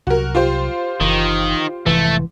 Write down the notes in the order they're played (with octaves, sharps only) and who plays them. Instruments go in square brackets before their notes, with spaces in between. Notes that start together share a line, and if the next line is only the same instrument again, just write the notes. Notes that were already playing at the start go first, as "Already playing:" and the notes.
[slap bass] C2 F#3 [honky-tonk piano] F#4 A#4
[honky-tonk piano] F4 G4 C5
[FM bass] F#1 [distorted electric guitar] D#3 [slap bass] E3
[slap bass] F1 G#2 [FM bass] E3 [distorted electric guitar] A3